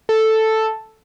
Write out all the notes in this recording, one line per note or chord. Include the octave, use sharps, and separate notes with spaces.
A4